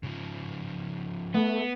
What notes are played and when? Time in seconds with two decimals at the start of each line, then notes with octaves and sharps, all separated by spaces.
0.04 C#3 F3
1.35 A3 B3